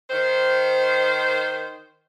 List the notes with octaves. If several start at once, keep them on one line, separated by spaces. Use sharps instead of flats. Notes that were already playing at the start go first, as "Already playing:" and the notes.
D#3 C5